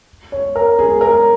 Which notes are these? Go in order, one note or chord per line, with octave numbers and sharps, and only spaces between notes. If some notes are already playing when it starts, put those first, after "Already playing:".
C#5
A#4
G#4
A#4